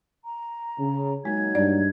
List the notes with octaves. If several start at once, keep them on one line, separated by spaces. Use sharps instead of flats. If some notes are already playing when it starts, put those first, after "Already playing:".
A#5
C#3
F#3 G#3 A#3 D#4 G#6
G2 D5